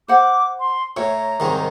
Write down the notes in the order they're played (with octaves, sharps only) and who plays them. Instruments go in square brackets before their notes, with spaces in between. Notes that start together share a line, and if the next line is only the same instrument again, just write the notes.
[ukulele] C5 F#5 [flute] D6
[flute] C6
[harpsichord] A2 [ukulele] C#5 [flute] A#5
[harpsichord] C2 G#2 D#3